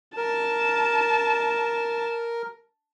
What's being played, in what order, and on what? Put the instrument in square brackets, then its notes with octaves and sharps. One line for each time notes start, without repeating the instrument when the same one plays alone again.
[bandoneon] A#4 [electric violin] A5